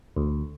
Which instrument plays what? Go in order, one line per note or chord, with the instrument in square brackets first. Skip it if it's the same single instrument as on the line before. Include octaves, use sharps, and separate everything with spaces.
[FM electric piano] D2